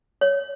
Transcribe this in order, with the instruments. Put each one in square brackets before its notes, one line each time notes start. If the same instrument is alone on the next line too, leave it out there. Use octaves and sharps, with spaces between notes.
[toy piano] C#5